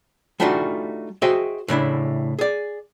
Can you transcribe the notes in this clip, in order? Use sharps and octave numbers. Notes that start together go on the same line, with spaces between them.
G3 A3 D4 D#4 F4 F#4
F#4 G#4 C5 D#5 E5 G5
A2 C#3 D4 E4
G#4 D5